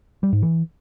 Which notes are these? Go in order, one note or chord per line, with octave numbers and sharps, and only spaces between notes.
G3
G#2
E3